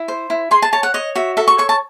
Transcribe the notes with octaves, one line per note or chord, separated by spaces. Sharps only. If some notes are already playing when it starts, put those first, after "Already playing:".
Already playing: E4
C5
E4
G#4 C6
A5
C#5 A5
F#5
C#5 D#5
F#4 E5
A4 E5
C#6
C#5 C#6
A5